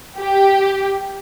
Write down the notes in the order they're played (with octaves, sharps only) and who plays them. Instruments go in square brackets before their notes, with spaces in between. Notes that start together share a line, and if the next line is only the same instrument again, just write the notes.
[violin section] G4